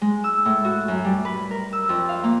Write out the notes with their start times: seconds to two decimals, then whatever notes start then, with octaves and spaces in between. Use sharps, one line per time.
0.02 G#3
0.24 E6
0.45 A2
0.65 F#4
0.88 F#2
1.05 G3
1.25 B4
1.51 A#4
1.73 E6
1.89 F2
2.09 F5
2.24 A#3